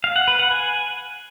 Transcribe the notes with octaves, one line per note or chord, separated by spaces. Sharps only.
F5
F#5
B4
F#5
G#5